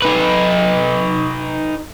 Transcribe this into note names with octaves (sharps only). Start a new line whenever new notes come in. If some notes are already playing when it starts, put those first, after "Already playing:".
D#4 B4